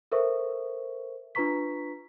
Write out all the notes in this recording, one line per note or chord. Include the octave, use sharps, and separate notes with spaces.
A4 A#4 C5 E5 C#6
D4 F4 B4 A#5 C#6 B6